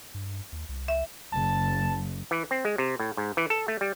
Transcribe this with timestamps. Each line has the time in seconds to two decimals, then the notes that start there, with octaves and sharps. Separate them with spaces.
0.14 G2
0.52 D#2
0.69 C2
0.88 E5
1.32 F#1 A5
2.31 E3
2.51 C4
2.65 G#3
2.78 C3
3.00 A2
3.17 G#2
3.37 E3
3.50 A4
3.68 A3
3.81 G3